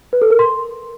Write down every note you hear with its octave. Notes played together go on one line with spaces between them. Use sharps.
B4
A4
A#4
C6